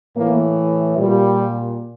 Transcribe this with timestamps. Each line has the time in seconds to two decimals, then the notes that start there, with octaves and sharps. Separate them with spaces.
0.15 A2 E3 A#3
0.97 A#2 G3